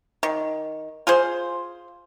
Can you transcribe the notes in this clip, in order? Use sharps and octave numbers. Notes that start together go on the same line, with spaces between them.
D#3
F4 G#4 C5